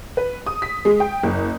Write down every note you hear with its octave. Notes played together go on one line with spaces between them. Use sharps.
B4
D#6
B6
G#3
G5
F#1